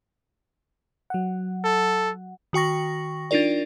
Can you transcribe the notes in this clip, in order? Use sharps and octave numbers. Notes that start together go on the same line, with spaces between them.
F#3 F#5
A4
D#3 F#4 G5 C#6 A#6
D4 D#4 F4 A#4 D5